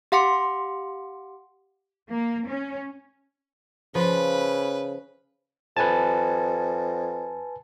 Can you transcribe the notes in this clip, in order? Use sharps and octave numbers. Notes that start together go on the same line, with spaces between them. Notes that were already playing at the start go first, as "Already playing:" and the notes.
G4 F5 F#5 C6 D6 C#7
A#3
C#4
C#3 F3 B4
F2 B4 G#5 A5